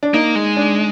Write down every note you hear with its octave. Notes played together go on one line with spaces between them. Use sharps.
D4
A#3 D#4
G#3
D4